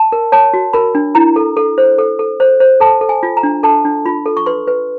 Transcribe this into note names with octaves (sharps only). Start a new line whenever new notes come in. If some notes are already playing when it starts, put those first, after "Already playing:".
Already playing: A5
A#4
C#5 A5
F#4
A#4 B5
D4
E4 A#5
A4
A4
C5
A4
A4
C5
C5
A4 A5
A4
G#5
F4
A#5
D4
A4 A5
D4
F4 B5
A4
C#6
B4 C6
B4